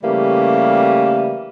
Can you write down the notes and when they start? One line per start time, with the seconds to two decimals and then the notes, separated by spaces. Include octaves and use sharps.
0.03 C#3 E3 G3 A3 A#3 G4